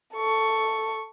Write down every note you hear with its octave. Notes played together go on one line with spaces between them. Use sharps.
A4 C#6